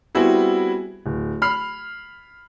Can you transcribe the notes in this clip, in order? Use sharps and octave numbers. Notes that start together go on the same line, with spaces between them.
G3 B3 C4 E4 F#4 G#4
D1
B5 F6 C7